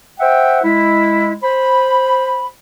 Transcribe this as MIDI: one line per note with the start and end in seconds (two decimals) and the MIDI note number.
0.20 0.61 72
0.20 0.61 76
0.20 0.61 78
0.20 0.61 79
0.64 1.34 56
0.64 1.34 64
1.43 2.47 72
1.43 2.47 83